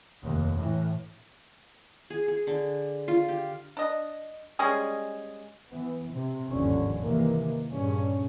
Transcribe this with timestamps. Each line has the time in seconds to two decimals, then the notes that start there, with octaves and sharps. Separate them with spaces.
0.22 F1 D#2
0.57 A2 E3
2.10 G#4
2.28 G#4
2.47 D3
3.08 F4
3.29 G4
3.77 D4 D#5
4.59 G3 G#3 C#4 G#4
5.69 E3 B3
6.10 C3 C4
6.49 G1 D#2 G#2 D3 F3 C#4
7.00 C3 D#3 E3 A#3
7.67 G2 A#2 C#3 C#4